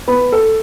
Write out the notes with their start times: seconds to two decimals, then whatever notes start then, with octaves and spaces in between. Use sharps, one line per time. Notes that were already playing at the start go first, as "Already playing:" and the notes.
0.08 B3
0.32 A4